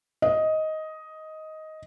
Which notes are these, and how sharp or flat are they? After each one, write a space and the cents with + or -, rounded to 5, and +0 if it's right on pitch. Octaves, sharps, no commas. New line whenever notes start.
D#5 +10